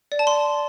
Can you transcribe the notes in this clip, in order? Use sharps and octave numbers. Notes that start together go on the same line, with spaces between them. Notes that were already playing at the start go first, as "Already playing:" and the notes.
D5
A5
C6